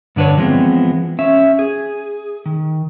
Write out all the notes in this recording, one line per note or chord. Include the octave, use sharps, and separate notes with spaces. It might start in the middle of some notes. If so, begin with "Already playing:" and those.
G2 D3 D4 B4 C#5
E3 F3 G#3 B3 C4
C#4 E5
G#4
D#3